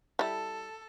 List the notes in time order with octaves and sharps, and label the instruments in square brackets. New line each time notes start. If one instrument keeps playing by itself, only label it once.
[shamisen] G3 E4 [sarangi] A4